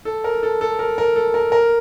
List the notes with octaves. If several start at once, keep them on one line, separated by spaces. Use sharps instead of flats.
A4
A#4
A4
A4
A#4
A#4
A4
A#4
A#4